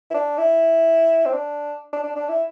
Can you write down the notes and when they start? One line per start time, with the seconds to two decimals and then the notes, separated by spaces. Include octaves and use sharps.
0.11 E4
0.14 D4
0.38 E4
1.25 C4
1.33 D4
1.93 D4
2.04 D4
2.16 D4
2.29 E4